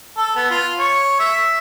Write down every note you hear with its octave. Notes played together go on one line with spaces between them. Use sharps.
A4
B3
F4
C#5
E5